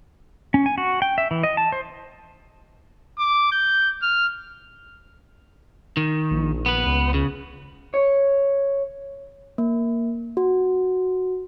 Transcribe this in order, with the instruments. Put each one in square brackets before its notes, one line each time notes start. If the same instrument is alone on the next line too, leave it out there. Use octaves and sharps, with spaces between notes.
[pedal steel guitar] C#4
G#5
F#4
G5
E5
E3
D#5
A5
C5
[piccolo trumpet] D6
G6
F6
[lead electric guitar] D#3
[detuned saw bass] A#1
[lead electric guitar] B3 B4
[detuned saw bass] C#2
[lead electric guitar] C#3
[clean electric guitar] C#5
[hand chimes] A#3
F#4